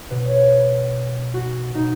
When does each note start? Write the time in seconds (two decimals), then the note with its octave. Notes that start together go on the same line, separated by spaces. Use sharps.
0.10 B2 B4
0.24 C#5
1.34 F#4
1.74 B2 D#4